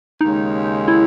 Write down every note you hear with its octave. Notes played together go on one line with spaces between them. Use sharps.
D#2 C#3 G#3 D#4
E4